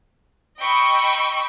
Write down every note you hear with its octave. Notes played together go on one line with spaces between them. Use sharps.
D#5 G5 B5 C#6 E6